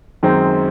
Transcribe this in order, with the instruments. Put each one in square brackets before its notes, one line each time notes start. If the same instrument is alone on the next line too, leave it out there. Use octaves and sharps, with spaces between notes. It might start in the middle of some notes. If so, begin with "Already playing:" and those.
[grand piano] F#2 D#3 G#3 C4